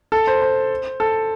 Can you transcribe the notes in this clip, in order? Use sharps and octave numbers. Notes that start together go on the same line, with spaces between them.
A4
C5
C5
A4